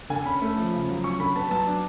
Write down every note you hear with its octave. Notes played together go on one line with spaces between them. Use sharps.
D3 G#5
C#4 B5
A3
F3
C#3
F#3
C#4 C#6
D3 B5
B3 A5
F#3 A5
D4